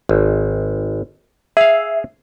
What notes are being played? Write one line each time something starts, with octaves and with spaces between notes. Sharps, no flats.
G#1
G#4 E5 F5